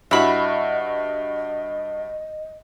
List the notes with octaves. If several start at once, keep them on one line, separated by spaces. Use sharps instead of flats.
G2 E4 F#4 D#5 E5 B5